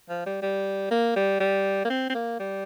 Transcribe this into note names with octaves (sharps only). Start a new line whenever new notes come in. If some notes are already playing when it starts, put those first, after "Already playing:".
F3
G3
G3
A#3
G3
G3
A#3
C4
C4
A#3
G3